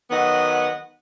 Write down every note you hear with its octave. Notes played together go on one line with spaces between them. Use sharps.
D#3 F#3 B3 D#5 F#5